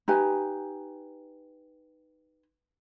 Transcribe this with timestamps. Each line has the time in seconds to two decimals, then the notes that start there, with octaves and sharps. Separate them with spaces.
0.08 D#4 G4 B4 G#5